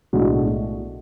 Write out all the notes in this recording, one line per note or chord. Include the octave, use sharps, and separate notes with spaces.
B1 A2 G#3 D4 F#4